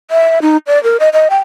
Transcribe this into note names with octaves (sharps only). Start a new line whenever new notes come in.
E5
D#4
D5
A#4
D#5
D#5
G5